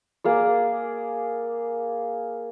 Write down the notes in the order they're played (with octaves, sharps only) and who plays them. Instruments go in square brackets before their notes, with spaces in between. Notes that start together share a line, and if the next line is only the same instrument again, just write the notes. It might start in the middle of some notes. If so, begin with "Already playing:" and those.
[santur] A#3 G#4 D5